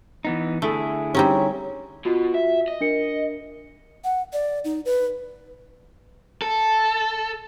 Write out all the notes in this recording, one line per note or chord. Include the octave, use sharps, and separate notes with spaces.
E3 B3 D#4
D3 A3 E4 G#4
G3 C4 C#4 D#4 G4 C#5 A#5
B2 F4 F#4
E5
D#5
D4 A#4 C#7
F#5
D5
D#4
B4
A4